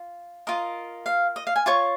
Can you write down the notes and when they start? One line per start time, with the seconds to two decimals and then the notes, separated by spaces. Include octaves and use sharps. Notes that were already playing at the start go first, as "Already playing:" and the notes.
Already playing: F4
0.47 F4 A#4 D#5
1.06 F5
1.36 D#5
1.47 F5
1.56 G#5
1.66 F4 C#5 C#6